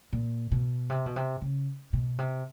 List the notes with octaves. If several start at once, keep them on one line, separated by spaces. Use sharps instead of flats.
A#2
B2
C3
B2
C3
C#3
B2
C3